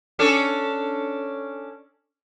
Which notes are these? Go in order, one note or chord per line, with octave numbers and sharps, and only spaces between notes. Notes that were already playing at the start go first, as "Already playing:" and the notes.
C#4 D4 A4